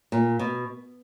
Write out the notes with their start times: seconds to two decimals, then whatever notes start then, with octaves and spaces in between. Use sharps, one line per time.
0.12 A#2
0.39 B2